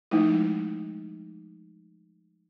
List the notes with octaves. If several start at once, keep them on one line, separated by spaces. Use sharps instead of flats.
F3 G#3 A3 D#4 E4